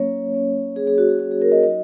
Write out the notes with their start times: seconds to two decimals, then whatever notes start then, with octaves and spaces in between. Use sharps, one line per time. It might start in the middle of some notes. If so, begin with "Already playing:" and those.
Already playing: F#3 A#3 C#4 C#5
0.34 F#3 A#3 C#4
0.76 F#3 A#3 C#4 G#4
0.87 G#4
0.98 F#4
1.09 G#4
1.19 F#3 A#3 C#4 F#4
1.31 G#4
1.42 A#4
1.52 D#5
1.63 F#3 D#4 F#4 D#5